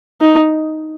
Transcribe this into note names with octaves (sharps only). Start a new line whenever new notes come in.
D#4